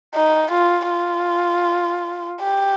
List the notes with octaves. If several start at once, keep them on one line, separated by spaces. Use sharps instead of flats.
D#4
F4
F4
G4